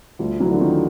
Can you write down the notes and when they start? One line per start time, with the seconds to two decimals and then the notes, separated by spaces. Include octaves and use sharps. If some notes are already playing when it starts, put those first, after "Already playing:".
0.19 D2 F3 G3
0.40 E3 F#3
0.51 D3
0.61 D#3 F3